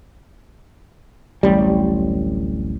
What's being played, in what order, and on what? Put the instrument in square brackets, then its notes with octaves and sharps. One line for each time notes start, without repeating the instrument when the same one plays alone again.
[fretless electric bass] D1 A1 G3